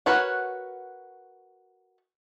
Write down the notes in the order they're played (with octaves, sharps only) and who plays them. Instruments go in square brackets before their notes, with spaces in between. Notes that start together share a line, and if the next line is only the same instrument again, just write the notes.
[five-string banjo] F#4 A#4 B4 C#5 F#5